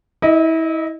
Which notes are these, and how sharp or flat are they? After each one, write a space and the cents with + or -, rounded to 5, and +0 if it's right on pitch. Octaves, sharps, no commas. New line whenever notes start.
E4 -30 D#5 +0